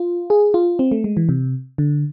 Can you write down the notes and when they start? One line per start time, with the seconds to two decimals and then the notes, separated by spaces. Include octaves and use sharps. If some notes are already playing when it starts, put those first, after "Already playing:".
Already playing: F4
0.30 G#4
0.54 F4
0.79 C4
0.92 A3
1.04 G#3
1.17 E3
1.29 C3
1.78 D3